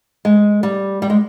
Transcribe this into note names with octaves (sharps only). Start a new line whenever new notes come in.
G#3
G3
G3
G#3